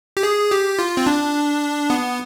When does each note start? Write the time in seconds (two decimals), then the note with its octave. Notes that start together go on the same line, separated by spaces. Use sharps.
0.17 G4
0.23 G#4
0.51 G4
0.79 F4
0.97 C4
1.07 D4
1.90 B3